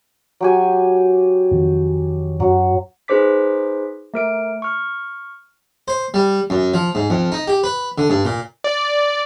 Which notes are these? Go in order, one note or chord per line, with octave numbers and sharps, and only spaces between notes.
F#3 G4 G#5
F2 D#3
F#2 F#3
D#4 G#4 B4 C5 D6 B6
A3 A#4 D7
C#6 F6
C5
G3
F#2
F3
G#2
F2
D#4
G4
B4
D3
G2
A#2
D5